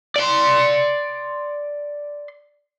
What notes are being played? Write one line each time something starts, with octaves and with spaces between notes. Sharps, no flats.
D5 C6